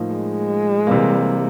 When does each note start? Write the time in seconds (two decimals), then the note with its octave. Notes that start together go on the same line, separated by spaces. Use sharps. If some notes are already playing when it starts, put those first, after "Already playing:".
Already playing: A2 F3 A#3 D#4
0.14 G#3
0.87 C3 E3 G3 A#3